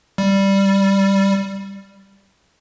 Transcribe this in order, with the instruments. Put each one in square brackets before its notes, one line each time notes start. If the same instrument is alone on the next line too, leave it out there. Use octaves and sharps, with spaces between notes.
[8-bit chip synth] G3